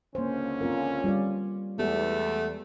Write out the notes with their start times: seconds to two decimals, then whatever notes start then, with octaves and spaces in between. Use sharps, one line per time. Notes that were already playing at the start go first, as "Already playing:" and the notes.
0.15 C#2 D3 A#3 C#4 C5
0.61 C4 F4 A#4
1.04 G3 F4 D5
1.79 E2 G#3 A3 B3 G4